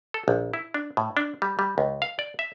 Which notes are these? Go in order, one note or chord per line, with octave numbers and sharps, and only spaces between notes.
A4
A#1
E4
D4
A2
D4
G3
G3
C#2
F5
D5
E5